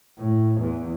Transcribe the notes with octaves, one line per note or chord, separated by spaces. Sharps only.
A2
E2